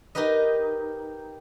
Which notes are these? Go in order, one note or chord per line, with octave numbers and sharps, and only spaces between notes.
D#4 G4 A#4 B4 D#5